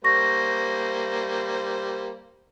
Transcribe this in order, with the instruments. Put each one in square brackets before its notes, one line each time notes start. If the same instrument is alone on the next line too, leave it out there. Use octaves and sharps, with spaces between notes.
[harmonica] G3 A#3 C5 [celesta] C#6 A#6